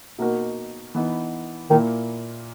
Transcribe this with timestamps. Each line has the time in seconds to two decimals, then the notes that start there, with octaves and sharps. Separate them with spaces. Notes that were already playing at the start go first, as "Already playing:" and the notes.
0.18 B2 A#3 D#4 F#4 A#4
0.95 E3 B3 D#4
1.70 A#2 D#3 A#3 E4